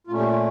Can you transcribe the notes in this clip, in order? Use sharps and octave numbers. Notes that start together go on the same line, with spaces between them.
A#2 A3 C#4 F4
G4
F4